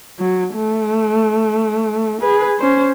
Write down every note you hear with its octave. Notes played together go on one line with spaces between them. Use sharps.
F#3
A3
G#4 B4
C#4 C5